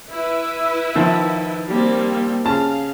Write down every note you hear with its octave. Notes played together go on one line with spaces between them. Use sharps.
E4 B4 E5
D#3 F3
G3 A#3 C4
C#3 F5 A5